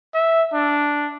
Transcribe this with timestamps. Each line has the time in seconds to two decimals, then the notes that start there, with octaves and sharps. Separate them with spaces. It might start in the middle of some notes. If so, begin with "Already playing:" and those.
0.15 E5
0.54 D4